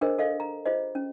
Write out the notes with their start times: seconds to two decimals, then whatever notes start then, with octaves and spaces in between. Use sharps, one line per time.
0.01 D4 G#4 A#4 C5 D#5
0.18 A4 D#5 F5
0.40 A#5
0.66 F4 G#4 C5 D#5
0.95 C#4